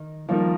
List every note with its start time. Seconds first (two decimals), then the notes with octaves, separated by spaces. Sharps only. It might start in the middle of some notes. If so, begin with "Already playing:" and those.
Already playing: D#3
0.29 D#3 F3 G3 A#3 D#4 A#4